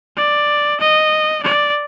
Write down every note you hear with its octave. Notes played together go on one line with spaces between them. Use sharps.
D5
D#5
D5